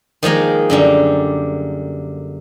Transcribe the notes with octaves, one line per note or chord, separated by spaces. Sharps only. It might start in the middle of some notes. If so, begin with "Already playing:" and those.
D#3 F3 G#3 A#3
F#2 D3 G3